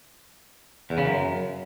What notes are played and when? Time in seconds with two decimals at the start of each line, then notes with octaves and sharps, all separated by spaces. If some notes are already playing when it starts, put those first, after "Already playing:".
0.90 E2
0.98 C#3
1.05 F#2